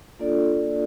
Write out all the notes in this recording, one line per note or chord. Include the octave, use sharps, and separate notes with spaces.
A#3 D4 F4 A4 D5